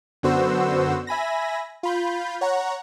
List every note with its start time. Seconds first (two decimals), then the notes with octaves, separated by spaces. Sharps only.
0.23 F#2 D3 B3 F#4 C5 E6
1.07 E5 G#5 B5 A#6
1.83 F4 B5 G6
2.41 C#5 F#5 A#5